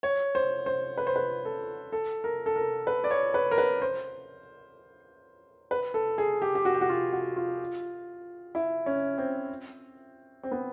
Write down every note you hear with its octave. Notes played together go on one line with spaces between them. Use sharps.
C#5
C5
C5
B4
C5
B4
A4
A4
A#4
A4
A#4
B4
D5
C#5
B4
A#4
B4
C5
B4
A4
G#4
G4
G4
F#4
G4
F#4
F4
F#4
F4
E4
C#4
C4
C4
B3